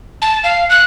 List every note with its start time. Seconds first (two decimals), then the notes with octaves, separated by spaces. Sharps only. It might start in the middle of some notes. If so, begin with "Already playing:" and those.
0.22 A5
0.44 F5
0.69 F#6